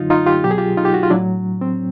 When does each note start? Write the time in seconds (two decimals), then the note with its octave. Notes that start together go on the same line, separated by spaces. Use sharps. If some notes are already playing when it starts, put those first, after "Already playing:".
Already playing: F#2 D3 F#3 D#4 F4
0.10 D#4 F4
0.26 F4 G4
0.44 C2 B2 F#3 G4
0.51 G#4
0.58 F4 G4
0.77 D#4 F4
0.85 G4
0.94 F#4
1.03 F4
1.10 A2 F#3 D4 E4
1.61 C4